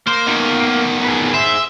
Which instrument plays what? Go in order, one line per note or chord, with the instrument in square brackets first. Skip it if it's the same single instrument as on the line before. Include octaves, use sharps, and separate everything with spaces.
[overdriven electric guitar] A#3 [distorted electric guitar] C5
[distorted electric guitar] B2 D#3
[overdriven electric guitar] G#4 B4
[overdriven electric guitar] G#4 C5 [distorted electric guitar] E5